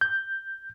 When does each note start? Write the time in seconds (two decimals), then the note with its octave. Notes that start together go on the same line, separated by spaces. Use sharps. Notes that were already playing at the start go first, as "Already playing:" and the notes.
0.01 G6